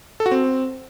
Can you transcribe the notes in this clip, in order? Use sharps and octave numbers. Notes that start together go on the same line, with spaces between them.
A4
F#4
C4